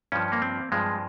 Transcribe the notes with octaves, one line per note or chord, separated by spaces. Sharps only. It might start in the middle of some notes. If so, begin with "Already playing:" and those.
G2 F3 C#4
A#3
C4
G2 F3 G#3